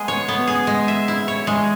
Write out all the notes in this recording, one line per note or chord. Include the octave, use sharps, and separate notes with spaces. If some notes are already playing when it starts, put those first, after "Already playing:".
Already playing: G#3 B3 G#4
C#5
B3
G#4
G#3
E5
E4
C#5
G#3